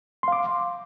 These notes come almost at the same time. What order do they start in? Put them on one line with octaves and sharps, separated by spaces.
C6 F5 D6